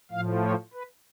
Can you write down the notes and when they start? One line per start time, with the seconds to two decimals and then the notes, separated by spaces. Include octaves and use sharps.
0.11 A2 F3 F5
0.43 C#5
0.74 B4